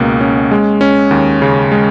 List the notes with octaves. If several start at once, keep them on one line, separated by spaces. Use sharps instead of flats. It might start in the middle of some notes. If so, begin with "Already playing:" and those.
Already playing: C#2 B2 A#3 C#4
C#4
G#3
C#4
D#2
C#3
G#3